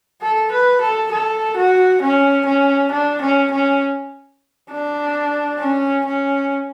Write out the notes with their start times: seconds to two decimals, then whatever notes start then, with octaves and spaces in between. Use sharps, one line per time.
0.22 A4
0.51 B4
0.81 A4
1.12 A4
1.57 F#4
2.02 C#4
2.46 C#4
2.91 D4
3.21 C#4
3.51 C#4
4.71 D4
5.60 C#4
6.05 C#4